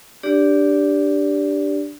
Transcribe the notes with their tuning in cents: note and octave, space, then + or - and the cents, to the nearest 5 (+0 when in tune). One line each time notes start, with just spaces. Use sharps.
D4 +0 G4 +0 D5 -20